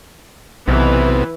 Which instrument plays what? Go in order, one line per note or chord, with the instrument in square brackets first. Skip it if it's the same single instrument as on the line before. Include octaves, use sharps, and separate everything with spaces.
[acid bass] B1 [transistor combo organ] C3 B3 [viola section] E3